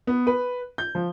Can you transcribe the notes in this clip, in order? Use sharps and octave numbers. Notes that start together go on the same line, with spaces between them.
B3
B4
G6
F3